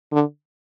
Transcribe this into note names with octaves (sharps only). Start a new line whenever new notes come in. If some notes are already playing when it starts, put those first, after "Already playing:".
D3